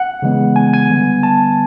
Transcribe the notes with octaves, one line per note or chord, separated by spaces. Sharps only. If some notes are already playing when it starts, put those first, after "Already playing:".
Already playing: F#5
C#3 E3 G#3 B3
G#5
G#5
D3 G3 B3
A5